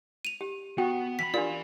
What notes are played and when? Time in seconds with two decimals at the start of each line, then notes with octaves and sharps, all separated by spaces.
0.25 D#7 F7
0.41 G4
0.78 B3 F#4 G5
1.19 E3 B5 B6
1.34 D4 F4 G4 A#4 D5